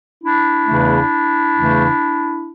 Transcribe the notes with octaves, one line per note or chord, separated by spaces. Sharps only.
D4 E4
E2 C#3 E3 A3
E2 C#3 E3 A3